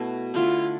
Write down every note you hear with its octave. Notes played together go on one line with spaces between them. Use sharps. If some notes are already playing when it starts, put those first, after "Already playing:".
Already playing: B2 A3 E4 B4
D3 A3 E4 F4